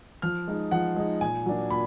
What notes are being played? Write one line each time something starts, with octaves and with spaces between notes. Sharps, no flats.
F3 F6
G#3 D#4
F3 F#5
G#3 D#4
A#2 G#5
F#3 A#3 D4
A#2 B5